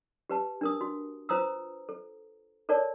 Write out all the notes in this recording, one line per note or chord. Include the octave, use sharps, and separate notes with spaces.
G4 B4 A5
D4 A#4 D#6
F#4
F4 B4 C5 A#5 D#6 E6
A4
A4 A#4 C#5 D5 A5